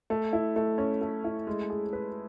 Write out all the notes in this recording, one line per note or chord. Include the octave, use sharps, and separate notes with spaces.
A3
E4
A3
C#4
A3
E4
G#3
G#4
B4